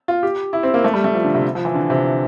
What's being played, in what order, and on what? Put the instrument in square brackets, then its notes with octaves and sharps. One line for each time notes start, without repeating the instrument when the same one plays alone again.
[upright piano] F4
G4
E4
C4
A#3
A3
G3
A3
F3
D3
C3
F3
E3
D3
C3